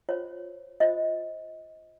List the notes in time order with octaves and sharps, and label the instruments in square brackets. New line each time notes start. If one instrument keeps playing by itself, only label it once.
[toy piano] F4 C5 C#5
F4 C5 D#5